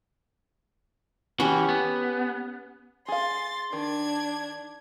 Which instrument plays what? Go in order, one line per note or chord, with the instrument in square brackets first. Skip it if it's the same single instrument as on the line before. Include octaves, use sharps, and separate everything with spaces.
[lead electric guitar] E3 F#4 [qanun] C#4 G4
[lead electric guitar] B3
[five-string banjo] G#4 F5 [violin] C6 A6
[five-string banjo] D#3 [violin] D4 G#6